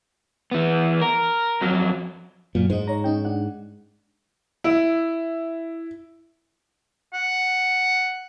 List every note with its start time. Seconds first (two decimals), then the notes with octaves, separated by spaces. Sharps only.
0.51 E3 B3
1.02 A#4
1.61 F2 F#3
2.55 F#2 A#2 F#3
2.70 G#2 D#4 C5
2.88 C#5 A#5
3.04 C#4 D#4 G5
3.25 D4 F#5
4.64 E4
7.14 F#5